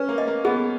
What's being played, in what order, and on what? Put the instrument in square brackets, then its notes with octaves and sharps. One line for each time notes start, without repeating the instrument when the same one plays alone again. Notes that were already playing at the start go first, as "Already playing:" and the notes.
Already playing: [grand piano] C#4 [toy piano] B4
[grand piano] A#3
[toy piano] D#5
[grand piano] A#3
[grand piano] B3 [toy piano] G#4